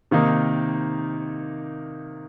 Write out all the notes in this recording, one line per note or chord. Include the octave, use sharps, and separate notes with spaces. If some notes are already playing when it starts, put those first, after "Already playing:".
C3 D#3 A#3 D#4